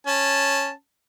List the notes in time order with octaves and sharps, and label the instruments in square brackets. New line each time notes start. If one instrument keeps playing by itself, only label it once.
[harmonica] C#4 A5